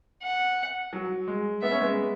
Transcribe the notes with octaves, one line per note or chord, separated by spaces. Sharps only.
F#5
F#3
G#3
B3 E5
C#4
G#3 B3